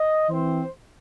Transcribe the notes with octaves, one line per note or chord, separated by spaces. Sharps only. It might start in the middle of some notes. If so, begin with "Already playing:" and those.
Already playing: D#5
E3 C4 C5